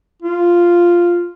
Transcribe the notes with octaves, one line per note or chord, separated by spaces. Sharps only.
F4